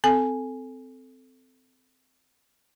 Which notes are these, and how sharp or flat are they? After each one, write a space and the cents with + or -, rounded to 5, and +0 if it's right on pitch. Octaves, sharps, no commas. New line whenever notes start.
C4 -20 A4 +0 G#5 +0